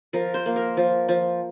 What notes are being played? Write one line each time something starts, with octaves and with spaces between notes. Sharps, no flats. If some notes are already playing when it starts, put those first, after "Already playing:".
F3 A#4
C5
A#3
A#4
F3
F3